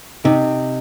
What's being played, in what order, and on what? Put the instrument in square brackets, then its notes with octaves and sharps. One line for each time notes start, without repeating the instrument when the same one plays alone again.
[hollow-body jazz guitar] C3 [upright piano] D#4